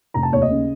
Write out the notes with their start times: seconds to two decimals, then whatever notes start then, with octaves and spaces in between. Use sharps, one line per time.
0.14 F1 A#5
0.23 A5
0.32 D#2 C#5
0.42 D#5
0.51 C#3